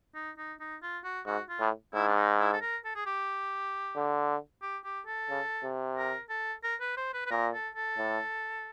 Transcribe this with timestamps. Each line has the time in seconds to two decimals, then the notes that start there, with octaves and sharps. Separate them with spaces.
0.15 D#4
0.38 D#4
0.60 D#4
0.83 F4
1.05 F#4
1.27 G#2 F#4
1.49 F4
1.60 A2
1.94 G#2 E4
2.08 D4
2.16 D#4
2.39 E4
2.53 A4
2.62 A#4
2.85 A4
2.96 G#4
3.06 G4
3.96 D3
4.62 G4
4.85 G4
5.07 A4
5.30 C#3
5.64 C3
5.97 A#4
6.30 A4
6.64 A#4
6.81 B4
6.97 C5
7.14 B4
7.26 B4
7.31 A#2 A#4
7.53 A4
7.75 A4
7.98 A2